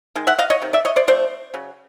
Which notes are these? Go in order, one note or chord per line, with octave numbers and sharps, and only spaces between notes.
D#3 G#3
E5 F#5
D#5 F5
C#5 D#5
C3 D#3
D5 E5
C#5 D#5
C5 D5
F3 A3 C4 C5 D5
C#3 F#3